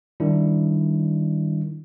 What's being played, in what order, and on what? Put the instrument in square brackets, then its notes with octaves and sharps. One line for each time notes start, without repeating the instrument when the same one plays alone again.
[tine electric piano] D#3 G3 D4 E4